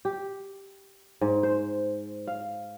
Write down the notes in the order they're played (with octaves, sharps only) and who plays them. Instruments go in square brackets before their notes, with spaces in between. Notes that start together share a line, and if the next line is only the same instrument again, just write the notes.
[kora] G4
G#2
C5
F5